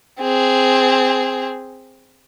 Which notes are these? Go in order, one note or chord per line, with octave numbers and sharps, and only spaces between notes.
C4 G#4